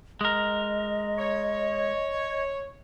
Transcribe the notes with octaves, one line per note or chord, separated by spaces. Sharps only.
G#3 A#4 D#5
C#5